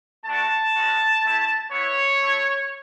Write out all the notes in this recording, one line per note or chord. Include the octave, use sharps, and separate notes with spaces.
A3 D4 F#4 A5
G#3 C#4 F#4
A3 E4
B3 E4 C#5
A3 E4